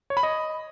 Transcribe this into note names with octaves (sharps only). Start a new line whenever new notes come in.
C#5
B5
D#5